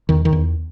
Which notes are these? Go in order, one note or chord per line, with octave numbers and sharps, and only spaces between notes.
E2 D#3
D#3
E2